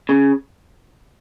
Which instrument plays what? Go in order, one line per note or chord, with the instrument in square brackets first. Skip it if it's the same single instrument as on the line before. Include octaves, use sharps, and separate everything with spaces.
[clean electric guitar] C#3